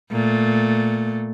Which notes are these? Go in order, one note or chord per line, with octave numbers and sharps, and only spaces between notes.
A#2 A3